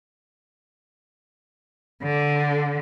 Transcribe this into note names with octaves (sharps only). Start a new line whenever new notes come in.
D3